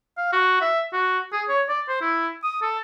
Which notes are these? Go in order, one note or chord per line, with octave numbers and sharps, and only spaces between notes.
F5
F#4
E5
F#4
G#4
C#5
D5
C5
E4
D#6
A4